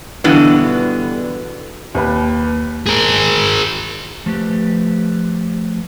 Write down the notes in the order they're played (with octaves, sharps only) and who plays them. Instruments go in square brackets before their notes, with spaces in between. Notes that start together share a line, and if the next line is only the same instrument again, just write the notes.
[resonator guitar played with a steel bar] G2 B2 D3 E3 B3
[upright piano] D#2 B4 B5
[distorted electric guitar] G#4 A#4
[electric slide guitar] F3 A3 G4 B4